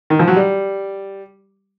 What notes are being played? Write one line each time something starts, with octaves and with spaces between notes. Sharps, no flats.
D#3
F3
F#3
G3